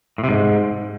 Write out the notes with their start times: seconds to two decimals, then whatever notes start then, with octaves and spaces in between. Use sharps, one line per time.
0.18 A2
0.24 C3
0.29 G#2